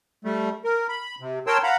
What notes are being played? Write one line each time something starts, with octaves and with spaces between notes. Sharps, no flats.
G3 A3
A#4
B5
C3
A#4 C#5 G5 A5 C6 E6
F5 F#5 A#5 B5